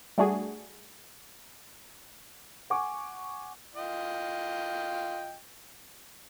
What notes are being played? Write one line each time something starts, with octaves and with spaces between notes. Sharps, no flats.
G3 A3 D4 F#4 G#4
F#5 G#5 C#6 D6
F4 D#5 G5